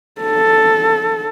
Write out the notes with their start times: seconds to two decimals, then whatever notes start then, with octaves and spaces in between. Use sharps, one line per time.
0.21 A4